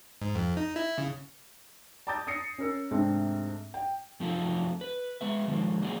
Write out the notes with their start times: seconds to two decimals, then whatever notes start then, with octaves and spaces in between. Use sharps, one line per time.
0.22 G#2
0.35 F2
0.57 D#4
0.76 E4
0.98 C#3
2.07 A5 A#5 D6 D#6 G6 A6
2.27 D#6 A#6 C7 C#7
2.58 C#4 A#4 E6
2.91 G#2 C3 A3 C4 D4
3.74 G5
4.20 F#2 C3 F3 A3 F4
4.81 B4
5.21 G#3 B3 E5
5.48 D#3 F3 G#3
5.81 F#3 A#3 G#4 D5 F5